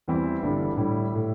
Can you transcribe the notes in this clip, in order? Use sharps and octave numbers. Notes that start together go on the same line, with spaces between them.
E2 E3 G3 C4 E4
G1 G2 D3 G3 E4
A2 G3 E4
A2 A3 E4